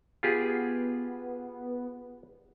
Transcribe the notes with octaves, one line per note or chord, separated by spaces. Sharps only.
B3 F4 G4 G#4